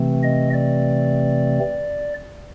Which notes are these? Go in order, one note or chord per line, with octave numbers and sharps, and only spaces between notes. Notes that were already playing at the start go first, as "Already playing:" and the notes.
Already playing: C3 E3 A3 C4
D#5
D5